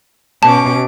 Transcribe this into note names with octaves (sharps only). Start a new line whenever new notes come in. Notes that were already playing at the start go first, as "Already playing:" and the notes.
B2 C#4 A5 D6